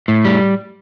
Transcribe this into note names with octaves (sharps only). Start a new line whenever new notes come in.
A2
G3